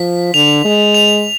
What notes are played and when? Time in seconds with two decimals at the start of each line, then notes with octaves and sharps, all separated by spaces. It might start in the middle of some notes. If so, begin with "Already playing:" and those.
Already playing: F3 B6
0.34 D3 F7
0.65 G#3
0.94 F7